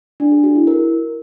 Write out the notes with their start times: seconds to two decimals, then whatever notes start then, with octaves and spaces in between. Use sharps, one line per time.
0.20 D4
0.32 G#4
0.44 F#4
0.55 E4
0.67 A#4